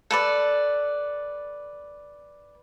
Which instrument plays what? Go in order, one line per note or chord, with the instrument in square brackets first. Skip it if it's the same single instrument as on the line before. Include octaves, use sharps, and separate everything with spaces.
[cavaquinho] A4 B4 D5